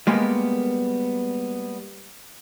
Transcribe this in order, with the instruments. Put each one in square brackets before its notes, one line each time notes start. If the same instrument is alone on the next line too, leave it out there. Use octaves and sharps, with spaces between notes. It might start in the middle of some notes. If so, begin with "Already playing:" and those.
[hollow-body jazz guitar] G3 G#3 A#3 B3